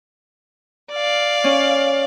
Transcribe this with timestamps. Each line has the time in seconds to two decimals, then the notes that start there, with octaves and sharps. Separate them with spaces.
0.92 D5 F5
1.44 C#4